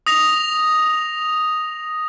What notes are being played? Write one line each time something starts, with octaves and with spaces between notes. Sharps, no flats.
D#6 A#6 F7